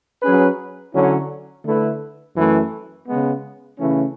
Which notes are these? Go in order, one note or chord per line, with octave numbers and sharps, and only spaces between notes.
F#3 C#4 G#4 B4
D3 F#3 C#4 E4
D3 A3 E4 B4
F#2 E3 A3
C#3 G#3 B3
C#3 E3 A3 C#4